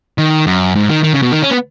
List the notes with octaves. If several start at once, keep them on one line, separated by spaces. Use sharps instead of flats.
D#3
F#2
G#2
D#3
D#3
C#3
B2
D#3
C#4
B3